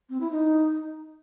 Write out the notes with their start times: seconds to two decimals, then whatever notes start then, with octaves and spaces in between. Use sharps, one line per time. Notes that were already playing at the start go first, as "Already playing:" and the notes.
0.10 C4
0.21 E4
0.31 D#4